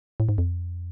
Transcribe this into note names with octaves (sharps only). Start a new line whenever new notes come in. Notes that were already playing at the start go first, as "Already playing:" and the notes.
A2
G#2
F2